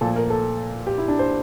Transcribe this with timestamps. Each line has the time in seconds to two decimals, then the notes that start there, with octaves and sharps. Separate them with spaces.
0.01 A#2 F3 A3 A4
0.16 A#4
0.30 A4
0.87 G4
0.98 E4
1.08 D4
1.19 C5